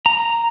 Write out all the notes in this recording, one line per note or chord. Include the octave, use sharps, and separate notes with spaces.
A#5